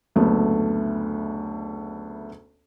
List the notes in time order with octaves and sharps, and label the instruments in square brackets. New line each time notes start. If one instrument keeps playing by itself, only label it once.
[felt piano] F#1 D2 A3 B3